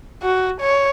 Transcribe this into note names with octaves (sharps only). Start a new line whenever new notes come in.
F#4
C#5